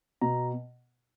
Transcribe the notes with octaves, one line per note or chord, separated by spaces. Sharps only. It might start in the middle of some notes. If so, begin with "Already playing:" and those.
B2 A#5